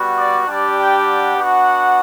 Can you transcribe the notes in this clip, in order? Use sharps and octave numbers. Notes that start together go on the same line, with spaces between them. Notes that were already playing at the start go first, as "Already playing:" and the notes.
Already playing: G3 B3 F#4
D5
G3 D4 G4 D5
G5
F#5
B3 D4 F#4